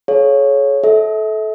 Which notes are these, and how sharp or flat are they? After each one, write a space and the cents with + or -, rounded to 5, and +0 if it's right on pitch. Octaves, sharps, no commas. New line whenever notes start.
G#4 +40 C#5 +0 F5 +0
A4 -20 E5 -35